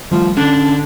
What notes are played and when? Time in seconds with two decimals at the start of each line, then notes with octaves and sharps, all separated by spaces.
0.11 D#3 F3 G3 A3
0.37 D3 C#4 D4